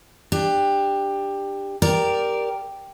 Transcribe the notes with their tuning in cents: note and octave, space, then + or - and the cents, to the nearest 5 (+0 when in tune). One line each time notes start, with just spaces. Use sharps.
D4 +15 G4 +15
G4 +0 A#4 +5 D5 -5